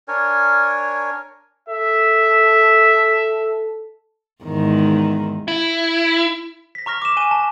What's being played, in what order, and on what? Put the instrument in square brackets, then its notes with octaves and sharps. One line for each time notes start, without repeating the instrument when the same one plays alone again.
[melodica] D4 A#4 C#5 G#5
[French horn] A4 [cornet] E5
[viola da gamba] E2 G#2 D#3
[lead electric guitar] E4
[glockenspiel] A#6 B6
A#5 C#6 F6 A#6
D6 E7
G#5 F#6 D#7 G7
A5